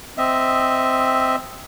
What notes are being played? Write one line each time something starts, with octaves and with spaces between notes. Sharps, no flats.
C4 D#5 E5